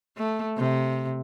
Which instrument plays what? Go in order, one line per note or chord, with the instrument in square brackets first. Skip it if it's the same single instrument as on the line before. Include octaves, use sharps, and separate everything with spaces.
[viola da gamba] A3
C3